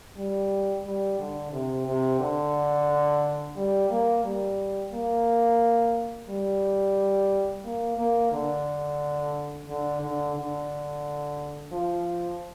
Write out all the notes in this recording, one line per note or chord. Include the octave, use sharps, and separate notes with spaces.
G3
G3
D3
C3
C3
D3
G3
A#3
G3
A#3
G3
A#3
A#3
D3
D3
D3
D3
F3